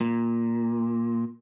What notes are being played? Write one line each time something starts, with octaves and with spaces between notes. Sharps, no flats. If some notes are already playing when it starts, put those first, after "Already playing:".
A#2